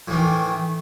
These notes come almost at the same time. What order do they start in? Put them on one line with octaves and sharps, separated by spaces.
A2 E3 D#3